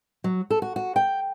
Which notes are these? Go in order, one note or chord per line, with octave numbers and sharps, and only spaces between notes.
F#3
A4
F#4
F#4
G5